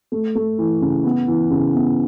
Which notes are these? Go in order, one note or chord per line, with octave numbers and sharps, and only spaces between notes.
A3
A3
E3
C#3
B3
E3
C#3
B3